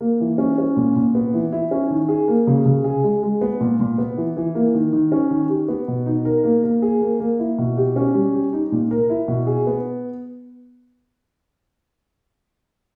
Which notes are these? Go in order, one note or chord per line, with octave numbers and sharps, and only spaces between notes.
A#3
E3
C#4
C#4
A#2
A#2
B3
E3
E4
C#4
D#3
G#4
A#3
C#3
C#3
G#4
G#3
G#3
B3
A#2
A#2
B3
E3
E3
A#3
D#3
D#3
C#4
D#3
G4
B3
B2
D#4
A#4
A#3
A#3
G#4
A#3
A#3
E4
B2
G4
C#4
G3
G4
D#4
A#2
A#4
E4
B2
G#4
B3